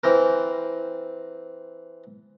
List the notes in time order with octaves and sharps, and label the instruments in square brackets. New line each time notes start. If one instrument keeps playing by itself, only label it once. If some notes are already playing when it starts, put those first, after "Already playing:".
[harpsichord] E3 C4 A#4